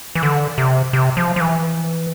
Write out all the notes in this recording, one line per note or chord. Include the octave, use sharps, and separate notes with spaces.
E3
D3
C3
C3
F3
F3
E3